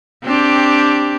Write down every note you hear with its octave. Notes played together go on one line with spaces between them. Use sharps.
C4 D4 G4